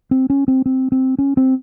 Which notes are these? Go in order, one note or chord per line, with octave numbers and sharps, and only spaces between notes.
C4
C#4
C4
C4
C4
C#4
C4